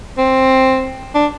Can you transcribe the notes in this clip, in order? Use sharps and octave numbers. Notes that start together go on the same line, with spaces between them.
C4
D4